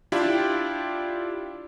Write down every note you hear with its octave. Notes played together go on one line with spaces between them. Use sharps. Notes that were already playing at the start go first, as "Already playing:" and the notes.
D4 E4 F4 G4